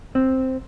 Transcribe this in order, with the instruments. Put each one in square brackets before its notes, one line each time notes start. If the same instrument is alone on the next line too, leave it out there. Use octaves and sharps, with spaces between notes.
[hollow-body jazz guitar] C4